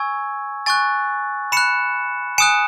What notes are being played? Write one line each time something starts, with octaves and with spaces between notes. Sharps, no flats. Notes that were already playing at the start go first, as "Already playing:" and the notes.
Already playing: G#5 C#6 E6 G#6
G#5 C#6 F#6 A6
B5 F#6 C#7 E7
G#5 D#6 F#6 C#7 E7